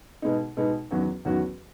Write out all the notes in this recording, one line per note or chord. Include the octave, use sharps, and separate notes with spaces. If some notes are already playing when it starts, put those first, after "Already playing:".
B2 G#3 B3 D#4
B2 G#3 B3 D#4
E2 D#3 F#3 C#4 F#4
E2 D#3 F#3 C#4 F#4